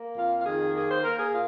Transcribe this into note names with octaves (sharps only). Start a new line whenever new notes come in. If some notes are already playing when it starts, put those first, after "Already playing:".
Already playing: A#3
F2 F4
F4
D#3 G#4
A#3 G#4
C5
A#3 A#4
G#4
A#2 F4